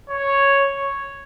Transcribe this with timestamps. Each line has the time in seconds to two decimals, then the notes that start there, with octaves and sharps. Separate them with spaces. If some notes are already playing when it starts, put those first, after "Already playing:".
0.09 C#5